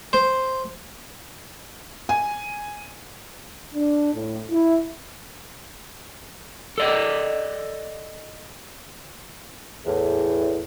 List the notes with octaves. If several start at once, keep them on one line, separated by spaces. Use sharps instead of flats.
C5
G#5
D4
A2
E4
A4 D5 D#5
E2 A2